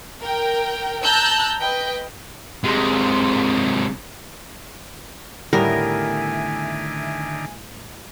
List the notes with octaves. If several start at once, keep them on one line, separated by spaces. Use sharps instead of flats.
A#4 G5
A5 A#5 E6 F#6 G6
B4 D#5 G5
C3 G#3
A2 D3 D#3 G3 B3 A#4 E5 G#5